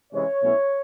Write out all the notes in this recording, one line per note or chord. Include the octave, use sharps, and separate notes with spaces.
C3 E3 G#3 C#4 E4 C#5
B2 F#3 A3 C#4 E4